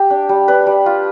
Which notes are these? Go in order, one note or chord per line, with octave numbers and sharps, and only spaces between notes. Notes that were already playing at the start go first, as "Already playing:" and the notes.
Already playing: G4
D4
G3
D4 B4
G3
F4